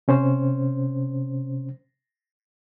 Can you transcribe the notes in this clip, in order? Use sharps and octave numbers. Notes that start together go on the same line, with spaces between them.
C3 C#4 C5